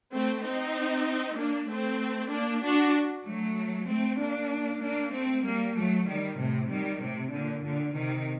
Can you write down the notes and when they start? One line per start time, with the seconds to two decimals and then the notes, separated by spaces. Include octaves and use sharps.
0.13 A3 C4
0.44 C4 D#4
1.38 A#3 D4
1.69 A3 C4
2.32 A#3 D4
2.63 D4 F#4
3.26 F#3 A3
3.88 A3 C4
4.21 A#3 D4
4.83 A#3 D4
5.13 A3 C4
5.45 G3 A#3
5.76 F#3 A3
6.07 D#3 G3
6.39 A2 C3
6.71 D#3 G3
7.01 A2 C3
7.33 A#2 D3
7.65 A#2 D3
7.96 C3 D#3